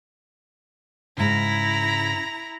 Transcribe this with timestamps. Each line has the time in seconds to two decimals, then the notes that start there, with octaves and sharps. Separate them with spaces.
1.18 G#2 C#3 E4 A#5